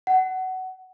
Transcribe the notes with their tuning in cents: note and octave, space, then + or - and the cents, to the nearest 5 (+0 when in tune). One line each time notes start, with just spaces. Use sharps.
F#5 +20